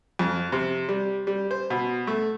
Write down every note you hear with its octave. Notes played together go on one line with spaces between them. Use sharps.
F2
C3
G3
G3
C5
B2
A3